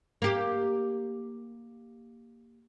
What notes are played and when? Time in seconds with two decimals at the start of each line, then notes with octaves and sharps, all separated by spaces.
0.22 A#3 G4